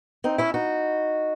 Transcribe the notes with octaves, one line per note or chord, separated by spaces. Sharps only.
C4 D#4
C#4 E4
D#4 F#4